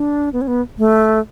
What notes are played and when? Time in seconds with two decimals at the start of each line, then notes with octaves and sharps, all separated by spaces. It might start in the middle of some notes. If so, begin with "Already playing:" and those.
Already playing: D4
0.33 B3
0.41 C#4
0.47 B3
0.78 A3